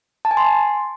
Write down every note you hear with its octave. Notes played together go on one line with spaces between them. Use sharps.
A5
G#5
C6